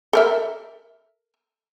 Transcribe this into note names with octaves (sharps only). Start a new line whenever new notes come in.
A4 A#4 E5